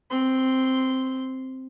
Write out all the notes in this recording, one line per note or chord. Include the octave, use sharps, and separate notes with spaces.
C4 C6